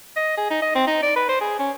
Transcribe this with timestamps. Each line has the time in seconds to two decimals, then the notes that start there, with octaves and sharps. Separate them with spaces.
0.16 D#5
0.37 G#4
0.50 D#4
0.62 D#5
0.75 C4
0.87 D#4
1.02 D5
1.16 B4
1.29 C5
1.41 G#4
1.59 C#4